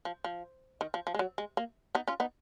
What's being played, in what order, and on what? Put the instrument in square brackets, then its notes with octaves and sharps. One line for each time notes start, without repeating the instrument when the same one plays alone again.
[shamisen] F3
F3
D#3
F3
F3
G#3
F#3
G#3
A#3
B3 D#4
C#4 F4
B3 D#4